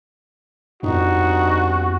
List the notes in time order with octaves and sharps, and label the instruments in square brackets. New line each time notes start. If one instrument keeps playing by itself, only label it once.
[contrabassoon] G1 [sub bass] F2 [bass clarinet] D#4 [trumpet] F#4